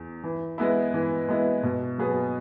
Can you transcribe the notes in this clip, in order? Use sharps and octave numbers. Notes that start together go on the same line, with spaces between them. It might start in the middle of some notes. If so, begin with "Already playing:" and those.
Already playing: E2
E3
G#3 B3 E4
E3
G#3 B3 E4
B2
F#3 B3 G#4